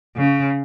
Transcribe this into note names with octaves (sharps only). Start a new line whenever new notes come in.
C#3